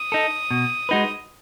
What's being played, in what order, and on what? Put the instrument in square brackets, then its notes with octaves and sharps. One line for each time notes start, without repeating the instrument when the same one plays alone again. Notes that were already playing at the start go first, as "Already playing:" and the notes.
Already playing: [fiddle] D#6
[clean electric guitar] D#4 A4
B2
G#3 D#4 F#4 B4